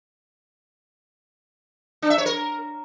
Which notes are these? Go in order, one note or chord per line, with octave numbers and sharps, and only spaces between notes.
D4
E5
C#5
A#4